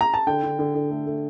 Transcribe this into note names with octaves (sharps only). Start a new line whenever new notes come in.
A#5
A5
D3 G5
D3
D3
D3
A3
A3